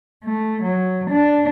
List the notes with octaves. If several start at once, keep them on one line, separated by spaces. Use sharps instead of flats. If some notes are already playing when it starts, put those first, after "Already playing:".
A3
F#3
D4